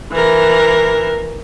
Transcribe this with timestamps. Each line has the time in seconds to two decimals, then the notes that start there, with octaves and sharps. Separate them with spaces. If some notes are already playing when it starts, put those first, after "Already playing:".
0.12 E3 A#4